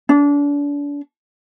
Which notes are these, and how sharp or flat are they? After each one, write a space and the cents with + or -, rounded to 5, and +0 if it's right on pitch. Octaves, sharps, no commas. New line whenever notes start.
D4 -35